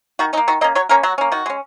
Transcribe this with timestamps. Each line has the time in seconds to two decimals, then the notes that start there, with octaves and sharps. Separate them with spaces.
0.19 D#3 F#4
0.33 C#4 D#4
0.37 A#3
0.48 D#3 F#4
0.61 A#3 C#4 D#5
0.75 F#3 C#5
0.89 A#3 C#4 A#4
1.03 F#3 F#4
1.18 A#3 C#4
1.32 D#3 F#4
1.46 G#3 C#4